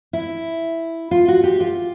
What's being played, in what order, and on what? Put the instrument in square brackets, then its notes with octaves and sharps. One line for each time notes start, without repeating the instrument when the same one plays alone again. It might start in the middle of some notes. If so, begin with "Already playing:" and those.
[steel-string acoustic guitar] E4
F4
F#4
G4
F4